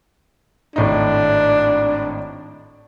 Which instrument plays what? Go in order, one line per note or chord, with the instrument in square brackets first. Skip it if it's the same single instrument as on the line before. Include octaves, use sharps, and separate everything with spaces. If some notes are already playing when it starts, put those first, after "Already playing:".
[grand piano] G#1 A2 D#4 [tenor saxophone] D4